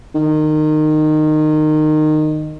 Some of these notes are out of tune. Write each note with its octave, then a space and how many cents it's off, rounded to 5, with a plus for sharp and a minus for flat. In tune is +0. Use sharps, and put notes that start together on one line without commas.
D#3 -20